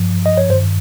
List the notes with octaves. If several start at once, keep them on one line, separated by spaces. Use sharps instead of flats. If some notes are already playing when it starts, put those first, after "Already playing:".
Already playing: G2 F3
D#5
C#5
G2 D#3 C5